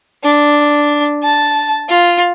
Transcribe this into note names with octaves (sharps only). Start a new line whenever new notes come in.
D4
A5
F4